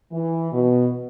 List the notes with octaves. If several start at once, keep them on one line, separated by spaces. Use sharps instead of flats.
E3
B2